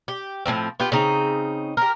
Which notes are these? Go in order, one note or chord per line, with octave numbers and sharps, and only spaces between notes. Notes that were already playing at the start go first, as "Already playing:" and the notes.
G4
A2 C#3 F3 C4
B3 F4 G4
C#3 C4 D#4
G4 A#4